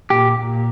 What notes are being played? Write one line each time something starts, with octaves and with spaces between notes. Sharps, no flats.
A#2 G4
A#2